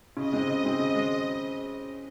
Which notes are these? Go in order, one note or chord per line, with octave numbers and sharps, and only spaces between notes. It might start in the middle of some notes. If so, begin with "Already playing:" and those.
C#3 D#5
G#3 C4
C#3 D#5
G#3 C4
C#3
G#3